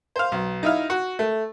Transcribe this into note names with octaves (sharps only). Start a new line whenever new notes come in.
C5 F5
B1
D#4 E4 F5
F#4
A3